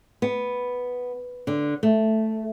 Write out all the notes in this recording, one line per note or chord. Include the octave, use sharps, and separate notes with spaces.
B3
D3
A3